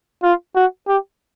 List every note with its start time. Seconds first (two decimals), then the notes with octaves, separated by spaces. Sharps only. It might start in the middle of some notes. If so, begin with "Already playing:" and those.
0.23 F4
0.55 F#4
0.88 G4